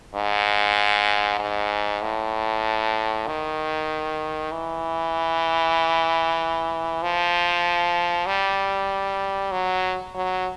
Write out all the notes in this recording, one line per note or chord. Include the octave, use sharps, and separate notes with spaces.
G#2
G#2
A2
D#3
E3
F3
G3
F#3
F#3